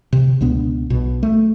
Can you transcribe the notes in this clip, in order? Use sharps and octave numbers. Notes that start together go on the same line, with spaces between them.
C3
C#2 B2 B3 D4
B1 B2
A3